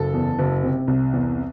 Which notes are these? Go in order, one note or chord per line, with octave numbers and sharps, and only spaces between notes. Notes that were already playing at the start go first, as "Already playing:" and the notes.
Already playing: F#1 A4
E2
F#1
C3
C2
E2